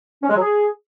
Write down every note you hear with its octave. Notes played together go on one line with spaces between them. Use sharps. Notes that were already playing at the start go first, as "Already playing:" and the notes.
C#4
G#3
F#3
G#4